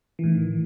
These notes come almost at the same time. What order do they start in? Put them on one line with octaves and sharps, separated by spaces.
E3 A2 D#3